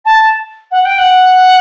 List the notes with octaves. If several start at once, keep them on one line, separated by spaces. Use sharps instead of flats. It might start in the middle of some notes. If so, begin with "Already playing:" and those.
A5
F#5
G5
F#5